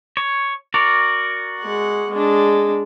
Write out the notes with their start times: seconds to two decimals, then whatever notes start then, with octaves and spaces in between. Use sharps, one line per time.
0.17 C#5
0.74 F#4 A#4 D5
1.60 G#3 F#5
2.10 G#3 D4